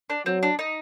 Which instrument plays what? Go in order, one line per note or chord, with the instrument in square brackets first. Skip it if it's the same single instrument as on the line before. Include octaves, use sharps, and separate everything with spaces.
[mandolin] D4
[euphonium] F#3 [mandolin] C4
[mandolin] D4
D#4